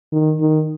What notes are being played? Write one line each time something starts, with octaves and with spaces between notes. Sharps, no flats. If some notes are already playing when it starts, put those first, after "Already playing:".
D#3
D#3